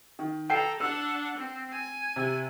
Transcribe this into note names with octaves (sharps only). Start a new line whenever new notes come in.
D#3
A4 G5 A#5 C7
D4 F#5 E6
C4
G#5
C3